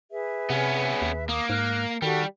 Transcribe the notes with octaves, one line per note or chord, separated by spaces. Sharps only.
G#4 B4 E5
C3 B3 C#4
D#2
A#3 D6 D#6
G#2 F6 F#6
D#3 G3 F#4 G4 A4